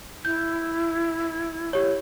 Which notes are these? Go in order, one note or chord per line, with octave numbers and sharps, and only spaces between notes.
E4 G6
G4 C#5